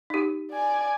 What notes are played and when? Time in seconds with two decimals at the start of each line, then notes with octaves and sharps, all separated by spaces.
0.10 D#4 G4
0.52 D5 G#5